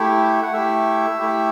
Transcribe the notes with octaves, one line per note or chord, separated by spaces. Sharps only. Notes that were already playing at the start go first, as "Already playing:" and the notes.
Already playing: A3 E4 G4
F#5
A3 E4 G4 E5
A3 E4 G4